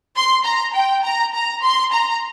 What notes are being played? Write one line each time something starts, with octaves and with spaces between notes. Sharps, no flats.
C6
A#5
G5
A#5
A#5
C6
A#5